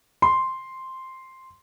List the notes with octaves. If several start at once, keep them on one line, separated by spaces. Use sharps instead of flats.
C6